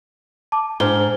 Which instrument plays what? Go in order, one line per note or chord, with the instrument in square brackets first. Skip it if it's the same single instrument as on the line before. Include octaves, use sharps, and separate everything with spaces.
[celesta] A5 D6
[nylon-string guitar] G#2 [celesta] D4 F6 G7